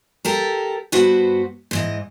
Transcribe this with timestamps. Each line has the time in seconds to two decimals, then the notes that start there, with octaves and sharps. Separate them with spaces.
0.25 G4 A4 A#4
0.92 G2 B3 F#4 B4 C5
1.71 G#2 E3 D#5